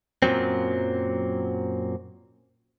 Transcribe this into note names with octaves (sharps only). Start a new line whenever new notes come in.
F#2 A#2 F#3 C4